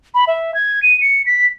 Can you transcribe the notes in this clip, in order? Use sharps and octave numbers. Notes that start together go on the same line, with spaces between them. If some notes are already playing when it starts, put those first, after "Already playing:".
B5
E5
G#6
D#7
C#7
B6